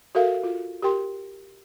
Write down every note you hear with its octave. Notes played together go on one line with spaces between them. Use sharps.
F#4 A4 A#4 E5 F5
F4
G4 A#4 G5 C6